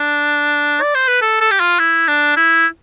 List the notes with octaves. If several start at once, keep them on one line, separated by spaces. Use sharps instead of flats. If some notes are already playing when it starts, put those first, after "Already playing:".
Already playing: D4
D5
C5
B4
A4
A4
G4
F4
E4
D4
E4